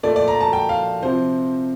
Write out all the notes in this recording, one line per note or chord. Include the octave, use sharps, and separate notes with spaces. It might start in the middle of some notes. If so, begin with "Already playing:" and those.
A#2 A3 D5
D5
A#5
A5
G5
F5
C3 F3 C5